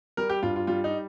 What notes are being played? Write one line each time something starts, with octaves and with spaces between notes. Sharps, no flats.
G3 A#4
G4
G2 F4
F4
G3 F4
D#4